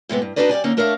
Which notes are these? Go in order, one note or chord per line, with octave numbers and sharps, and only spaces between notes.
A2 C3 G#3 B3
G2
D4 D#4 F#4 B4 D5 D#5
F#2 G4 D5 G#5
D3 A#3 C#4 D#4
A3 D4 A#4 C#5 E5 F5